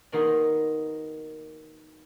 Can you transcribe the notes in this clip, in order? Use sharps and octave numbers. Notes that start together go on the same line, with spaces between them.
B2 D#3 A#3 B3 G#4 C6